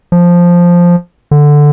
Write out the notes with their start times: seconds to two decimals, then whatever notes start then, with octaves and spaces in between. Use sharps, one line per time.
0.12 F3
1.31 D3